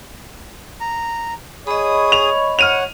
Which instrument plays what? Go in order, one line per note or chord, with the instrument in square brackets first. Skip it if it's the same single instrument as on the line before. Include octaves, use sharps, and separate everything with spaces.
[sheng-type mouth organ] A#5
[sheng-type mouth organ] G#4 D#6 [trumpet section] C#5 [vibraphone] D#5 B5
[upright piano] F7
[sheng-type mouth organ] C#5 F#5 [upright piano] F6 D#7 F7